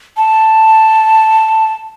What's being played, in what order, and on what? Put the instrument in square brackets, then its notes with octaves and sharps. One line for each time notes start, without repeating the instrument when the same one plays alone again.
[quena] A5